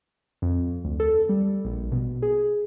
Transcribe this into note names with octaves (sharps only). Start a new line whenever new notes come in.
F2
D2
A4
G3
A#1
B2
G#4